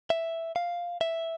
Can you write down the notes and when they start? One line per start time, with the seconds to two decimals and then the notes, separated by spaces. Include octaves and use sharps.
0.10 E5
0.56 F5
1.01 E5